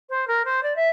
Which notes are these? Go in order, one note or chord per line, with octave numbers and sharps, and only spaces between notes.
C5
A#4
C5
D5
E5